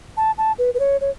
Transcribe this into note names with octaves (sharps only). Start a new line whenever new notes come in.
A5
A5
B4
B4
C#5
C#5